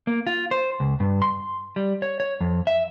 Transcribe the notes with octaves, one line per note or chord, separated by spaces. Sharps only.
A#3
F4
C5
C#2
G2
C6
G3
C#5
C#5
F2
E5